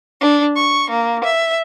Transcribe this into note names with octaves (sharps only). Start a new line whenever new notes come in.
D4
C#6
A#3
E5